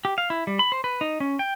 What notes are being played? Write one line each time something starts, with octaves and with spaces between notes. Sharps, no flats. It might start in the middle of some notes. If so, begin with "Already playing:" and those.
G4
F5
E4
G3
B5
C5
B4
D#4
C#4
G5